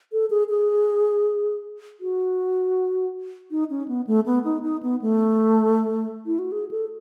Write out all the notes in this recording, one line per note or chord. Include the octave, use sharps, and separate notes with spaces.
A4
G#4
G#4
F#4
D#4
C#4
B3
A3
B3
D#4
D#4
B3
A3
E4
F#4
G#4
A4